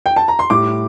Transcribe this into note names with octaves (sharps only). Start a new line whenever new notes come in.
G5
A5
A#5
C6
A2 G3 D6